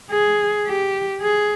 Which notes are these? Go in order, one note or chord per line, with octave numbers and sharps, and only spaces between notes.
G#4
G4
G#4